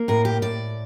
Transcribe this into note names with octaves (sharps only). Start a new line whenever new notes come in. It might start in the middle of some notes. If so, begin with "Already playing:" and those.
Already playing: A#3
A2 A#4
G4
A2 D5